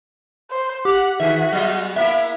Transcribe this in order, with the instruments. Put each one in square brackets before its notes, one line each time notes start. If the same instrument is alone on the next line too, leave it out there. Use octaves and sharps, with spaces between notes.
[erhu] C5
[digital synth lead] G4 [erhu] F#5
[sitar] D#3 G#4 [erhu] F#4 [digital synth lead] E5
[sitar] F#3 B3 D#5
[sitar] A#3 B3 E4 [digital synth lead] E5